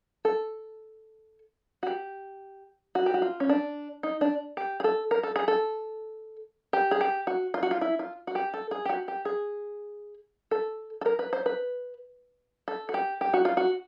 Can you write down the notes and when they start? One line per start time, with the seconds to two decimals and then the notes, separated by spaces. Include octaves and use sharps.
0.25 A4
1.83 F#4
1.87 G4
2.95 F#4
3.06 G4
3.14 F#4
3.22 F4
3.40 C#4
3.49 D4
4.03 D#4
4.21 D4
4.57 G4
4.80 G#4
4.84 A4
5.11 A#4
5.23 A4
5.36 G#4
5.48 A4
6.73 G4
6.91 G#4
7.01 G4
7.27 F#4
7.54 F4
7.63 F#4
7.71 F4
7.81 E4
7.99 F4
8.27 F#4
8.35 G4
8.54 A4
8.71 G#4
8.85 G4
8.89 F#4
9.08 G4
9.25 G#4
10.51 A4
11.01 A4
11.06 A#4
11.19 B4
11.33 C5
11.46 B4
12.68 A4
12.89 F#4
12.94 G4
13.21 G4
13.34 F#4
13.45 F4
13.57 F#4